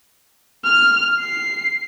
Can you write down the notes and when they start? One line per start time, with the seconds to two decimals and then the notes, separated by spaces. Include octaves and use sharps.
0.65 F6
1.20 C7